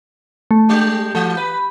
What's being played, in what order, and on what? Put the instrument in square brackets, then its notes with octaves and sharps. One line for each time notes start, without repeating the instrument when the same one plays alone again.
[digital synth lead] A3
[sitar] G3 D4 G4
[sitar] E3 [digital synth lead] A3
[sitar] B4 [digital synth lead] B5